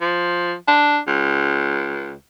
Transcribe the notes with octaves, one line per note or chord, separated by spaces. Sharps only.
F3
D4
C#2